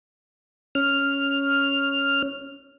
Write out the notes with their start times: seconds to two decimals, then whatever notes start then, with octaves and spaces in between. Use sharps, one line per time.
0.75 C#4 F6